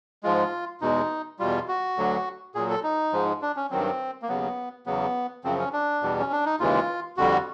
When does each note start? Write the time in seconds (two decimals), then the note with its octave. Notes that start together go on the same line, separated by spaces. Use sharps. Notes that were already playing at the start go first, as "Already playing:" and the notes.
0.23 G#2 F3 G#3 F4
0.81 E2 B2 G#3 D#4
1.39 E2 B2 G3 F4
1.68 F#4
1.97 D2 D3 F#3
2.55 A#2 F#3 G#4
2.70 A4
2.83 D#4
3.13 G#2 F3 G#3
3.42 D4
3.56 C#4
3.71 G2 D#3 F#3 C4
4.22 A#3
4.28 D#2 C#3 F#3 B3
4.86 E2 C#3 F#3 B3
5.44 F#2 C#3 F3 C4
5.59 C#4
5.73 D4
6.02 E2 B2 G3
6.20 C#4
6.32 D4
6.46 D#4
6.60 D#2 C#3 E3 G#3 F4
7.17 F2 D3 G3 F#4